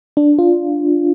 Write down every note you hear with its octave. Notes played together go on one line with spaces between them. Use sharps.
D4
F4